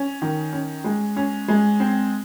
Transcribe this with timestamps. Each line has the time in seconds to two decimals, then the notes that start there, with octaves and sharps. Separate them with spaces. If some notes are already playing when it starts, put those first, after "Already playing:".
Already playing: C#4
0.22 D#3
0.53 C#4
0.84 G#3
1.16 C#4
1.48 G#3
1.80 C4